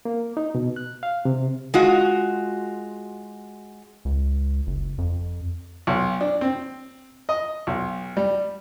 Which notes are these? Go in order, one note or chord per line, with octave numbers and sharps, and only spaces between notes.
A#3
D#4
B2
F#6
F5
C3
G#3 F4 F#4
C#2
F#1
F2
B1
D4
C4
D#5
B1
G3